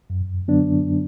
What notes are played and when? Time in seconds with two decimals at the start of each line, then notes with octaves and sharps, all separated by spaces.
0.10 F#2
0.48 D3 F#3 B3 D4